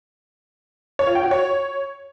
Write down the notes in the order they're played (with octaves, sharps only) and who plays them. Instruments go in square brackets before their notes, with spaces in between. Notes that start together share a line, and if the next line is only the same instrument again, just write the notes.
[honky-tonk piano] C#5
F4
G5
F#4
C#5